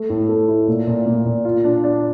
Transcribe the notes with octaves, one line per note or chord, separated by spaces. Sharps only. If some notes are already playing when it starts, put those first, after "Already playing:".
Already playing: A3
A2
A3
E4
A#2
A#2
A#2
A#2
F4
D4
D4